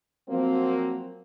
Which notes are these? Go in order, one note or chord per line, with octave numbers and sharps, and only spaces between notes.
F3 F#3 A#3 C4